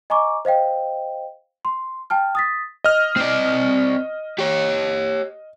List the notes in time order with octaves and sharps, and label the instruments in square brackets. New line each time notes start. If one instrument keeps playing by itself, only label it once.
[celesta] D#5 G#5 A#5 C#6 D6
C5 D#5 F5 G5
C6
G5 A5 F6
D#6 A6 B6
[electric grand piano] D#5 F6
[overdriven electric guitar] C4 D5
G4 C#5